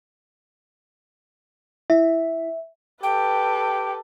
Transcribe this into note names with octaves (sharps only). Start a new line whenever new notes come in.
E4 E5
G4 A4 B4 G5